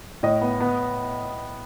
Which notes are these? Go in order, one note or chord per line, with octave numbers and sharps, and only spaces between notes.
A2 D#5
B3
B3